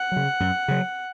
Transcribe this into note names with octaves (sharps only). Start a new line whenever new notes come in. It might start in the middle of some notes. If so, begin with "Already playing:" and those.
Already playing: F#5
F#3
C#3
F#2
C#3 F#3